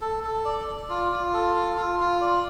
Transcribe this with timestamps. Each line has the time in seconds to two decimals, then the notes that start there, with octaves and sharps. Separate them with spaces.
0.01 A4
0.23 A4
0.45 D5
0.67 D5
0.89 F4
1.12 F4
1.33 A4
1.56 F4
1.77 F4
2.00 F4
2.21 D5